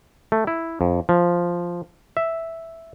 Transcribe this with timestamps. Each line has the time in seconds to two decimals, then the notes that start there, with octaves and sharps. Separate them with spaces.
0.32 A3
0.47 E4
0.81 F2
1.09 F3
2.17 E5